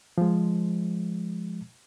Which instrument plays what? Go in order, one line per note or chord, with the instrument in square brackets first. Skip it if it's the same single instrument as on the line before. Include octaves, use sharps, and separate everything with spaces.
[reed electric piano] F3 G#3